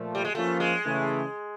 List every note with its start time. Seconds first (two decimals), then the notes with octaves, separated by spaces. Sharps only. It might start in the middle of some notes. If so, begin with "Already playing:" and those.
Already playing: A#2 F3 A3
0.15 G3
0.25 G#3
0.35 F3 A3 A#3 C#4 F4
0.60 G#3
0.85 C#3 E3 A3